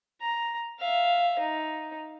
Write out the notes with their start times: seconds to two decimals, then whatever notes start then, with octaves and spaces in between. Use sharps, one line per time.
0.21 A#5
0.79 E5 F5
1.39 D#4